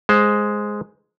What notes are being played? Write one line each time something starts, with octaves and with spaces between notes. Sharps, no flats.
G#3 C5